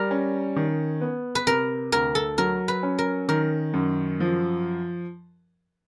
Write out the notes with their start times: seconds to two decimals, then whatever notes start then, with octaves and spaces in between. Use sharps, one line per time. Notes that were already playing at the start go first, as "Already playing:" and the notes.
Already playing: G3 A#4
0.11 C#4
0.56 D#3
1.01 B3
1.35 B4
1.47 C3 A#4
1.92 D2 A#4
2.15 A4
2.38 F#3 A#4
2.68 B4
2.83 C#4
2.99 A#4
3.29 D#3 A#4
3.74 F#2
4.20 F3